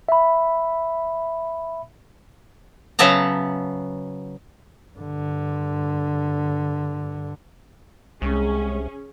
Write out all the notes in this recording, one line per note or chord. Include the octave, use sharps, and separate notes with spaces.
E5 B5
C#3 F#3 B3 E5 A5 A#5
G2 D3
C2 G#3 C#4 G#4